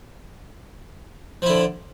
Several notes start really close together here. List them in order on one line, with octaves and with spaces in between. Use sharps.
F3 E4 D3